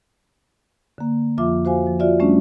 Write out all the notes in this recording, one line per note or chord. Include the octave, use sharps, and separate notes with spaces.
D3 A#3
F2 F3 F4 E5 D6
F#4 C5 F5 G#5
F3
F4 F#4 D5 E5
G3 A3 C#4 D4